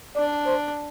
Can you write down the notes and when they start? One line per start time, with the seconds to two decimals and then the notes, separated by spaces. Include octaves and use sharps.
0.16 D4 D5
0.46 C5